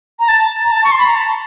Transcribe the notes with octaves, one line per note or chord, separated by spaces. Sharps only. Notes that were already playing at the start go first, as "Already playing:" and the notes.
A#5
A5
A#5
A5
C#6
C6
B5
A#5
A5